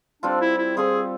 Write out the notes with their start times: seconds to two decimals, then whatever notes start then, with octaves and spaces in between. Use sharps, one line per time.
0.22 G3 C4 D4 F4 A4
0.41 E4
0.58 E4
0.77 G3 C4 F4 G#4 A4